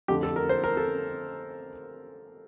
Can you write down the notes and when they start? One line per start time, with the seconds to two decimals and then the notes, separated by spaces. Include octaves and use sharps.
0.08 F2 D3 A3 G4
0.23 A4
0.36 A#4
0.49 C5
0.64 A#4
0.77 A4